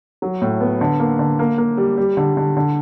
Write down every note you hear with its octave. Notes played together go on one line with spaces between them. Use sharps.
F#3
A2
B3
D3
A#3
D3
A#3
A#3
G3
G3
D3
D3
D3